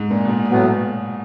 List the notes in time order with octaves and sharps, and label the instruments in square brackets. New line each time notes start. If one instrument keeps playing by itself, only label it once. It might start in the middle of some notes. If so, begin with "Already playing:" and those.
Already playing: [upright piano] G#2
A#2
B2
A#2
[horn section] A2 F#3 B3